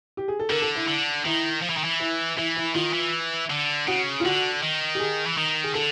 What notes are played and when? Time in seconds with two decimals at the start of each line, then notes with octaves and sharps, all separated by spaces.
0.17 G4
0.28 G#4
0.39 A4
0.50 D3 A#4
0.62 A4
0.75 E4
0.88 D3
1.25 D#3 E4
1.62 F3
1.69 E3
1.77 D#3
1.84 E3
2.00 E4
2.37 E3 E4
2.56 E4
2.75 D#3 F4
2.93 E3
3.50 D3
3.87 C#3 F#4
4.20 F4
4.25 D3 F#4
4.63 D#3
4.95 G4
5.00 G#4
5.26 E3
5.37 D#3
5.64 G#4
5.74 D3 A4